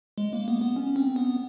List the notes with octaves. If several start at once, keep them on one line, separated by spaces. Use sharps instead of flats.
G#3
A#3
B3
B3
C#4
C4
B3